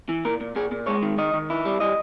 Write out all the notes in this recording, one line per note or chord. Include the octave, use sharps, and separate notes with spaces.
E3
A#2 A#4
A#2
A#2 G#4
A#2
G#3 C#5
D#3
D#3 D#5
D#3
E4
G3
G3 D#5